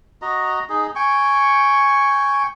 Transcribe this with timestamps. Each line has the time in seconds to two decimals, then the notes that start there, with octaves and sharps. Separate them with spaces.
0.22 F#4 D#5 A#5
0.69 D#4 G#4
0.95 G5 G#5 C#6